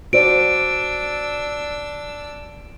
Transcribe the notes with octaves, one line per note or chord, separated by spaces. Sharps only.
D4 F#4 C5 D5 E6 D7